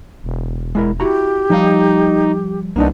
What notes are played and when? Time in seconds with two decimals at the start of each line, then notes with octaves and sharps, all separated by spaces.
0.24 E1
0.75 G#3 E4 A#4
1.00 E4 F#4 G4 A#5
1.50 F3 G3 D#4 F5
2.76 C2 A#3 B3 D4 D#4